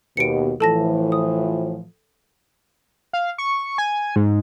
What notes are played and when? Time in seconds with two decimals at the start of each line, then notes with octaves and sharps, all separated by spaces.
0.17 D#2 B2 G4 C#7 D7
0.60 A2 E3 F3 A4 A5 A#6
1.12 D#6
3.13 F5
3.38 C#6
3.78 G#5
4.16 G#2